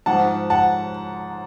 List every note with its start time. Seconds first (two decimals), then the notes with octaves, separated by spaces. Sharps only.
0.06 G#2 F3 F#5 A5
0.50 F#5 A5